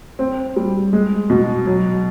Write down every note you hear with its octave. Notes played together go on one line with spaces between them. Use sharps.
C4
G3
G#3
B2
F#3